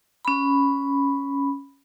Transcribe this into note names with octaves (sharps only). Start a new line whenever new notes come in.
C#4 B5